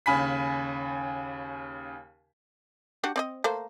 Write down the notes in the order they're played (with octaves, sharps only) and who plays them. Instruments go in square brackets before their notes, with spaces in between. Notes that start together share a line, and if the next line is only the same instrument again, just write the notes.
[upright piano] D#2 C#3 G#5 B5 B6
[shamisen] D4 F#4 G4
C4 D5 D#5
A3 A#3 C5